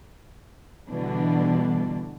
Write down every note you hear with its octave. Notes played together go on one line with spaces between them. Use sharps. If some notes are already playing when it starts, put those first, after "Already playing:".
B2 D3 E3 G3 D4